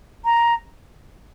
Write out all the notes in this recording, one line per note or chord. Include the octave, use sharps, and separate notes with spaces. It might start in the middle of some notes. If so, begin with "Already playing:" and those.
A#5